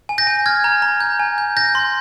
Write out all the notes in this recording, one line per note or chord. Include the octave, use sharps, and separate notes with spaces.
G#5
G6 A#6
G#5
F6 G#6
A#5
A#5
G6
G#5
G6
G6 A#6
C6